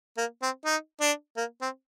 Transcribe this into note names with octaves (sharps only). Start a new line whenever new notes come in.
A#3
C4
D#4
D4
A#3
C4